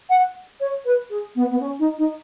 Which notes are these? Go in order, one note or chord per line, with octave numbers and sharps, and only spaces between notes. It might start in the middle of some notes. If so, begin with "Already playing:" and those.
F#5
C#5
B4
G#4
B3
B3
C#4
D#4
D#4